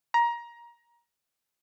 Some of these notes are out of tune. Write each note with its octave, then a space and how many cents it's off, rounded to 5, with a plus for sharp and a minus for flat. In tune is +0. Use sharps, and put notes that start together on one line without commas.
A#5 +20